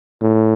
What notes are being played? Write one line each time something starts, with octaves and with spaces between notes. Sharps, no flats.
A2